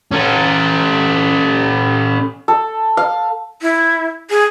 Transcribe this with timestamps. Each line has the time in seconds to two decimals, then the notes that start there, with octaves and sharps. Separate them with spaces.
0.11 C#4 A4
2.48 A4
2.97 F5
3.62 E4
4.30 G#4